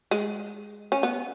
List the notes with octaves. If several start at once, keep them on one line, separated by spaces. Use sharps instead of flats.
G#3
C#4
B3